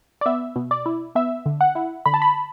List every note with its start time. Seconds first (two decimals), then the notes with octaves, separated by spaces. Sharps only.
0.21 D5
0.26 B3 E5
0.56 B2
0.71 D5
0.86 E4
1.15 B3 E5
1.46 D3
1.61 F#5
1.75 E4
2.06 D3 B5
2.14 A5
2.22 B5